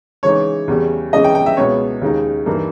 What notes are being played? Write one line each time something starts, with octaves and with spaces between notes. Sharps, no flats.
C#3 E3 G#3 D#4 C#5
E2 C#3 G3
C#3 E3 G#3 C#4 E4 D#5
G5
G5
E5
C#2 B2 G#3 B3 E4 C#5
D#2 C#3 G#3 D#4
G2 E3 A#3 D#4